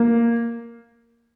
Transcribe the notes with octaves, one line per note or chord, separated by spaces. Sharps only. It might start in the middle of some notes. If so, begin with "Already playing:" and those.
Already playing: A#3